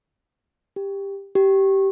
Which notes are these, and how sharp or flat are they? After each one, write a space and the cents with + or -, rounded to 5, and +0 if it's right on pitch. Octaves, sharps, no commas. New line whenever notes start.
G4 +15
G4 -15